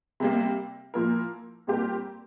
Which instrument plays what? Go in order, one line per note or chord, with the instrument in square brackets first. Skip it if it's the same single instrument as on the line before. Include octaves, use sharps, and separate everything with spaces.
[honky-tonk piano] C3 G3 A#3
A#2 F3 A#3 E4 A#4
A#2 G3 C4 G4 A#4